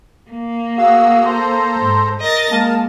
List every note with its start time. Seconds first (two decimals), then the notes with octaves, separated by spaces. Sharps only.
0.29 A#3
0.78 F#4 G#4 F5 E6
1.26 A4 C5 A#5 C6
1.79 G#2
2.20 A#4 D#5 A6
2.51 G#3 A#3 A#4 A5